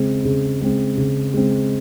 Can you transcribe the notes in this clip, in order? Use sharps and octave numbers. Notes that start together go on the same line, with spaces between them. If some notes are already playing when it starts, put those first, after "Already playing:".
Already playing: C#3 G#3 C4
C#3
G#3 C4
C#3
G#3 C4